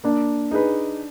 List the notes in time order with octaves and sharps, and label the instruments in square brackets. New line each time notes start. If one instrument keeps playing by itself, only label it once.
[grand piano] A#3 [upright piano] D4
[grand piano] D#4 G#4 B4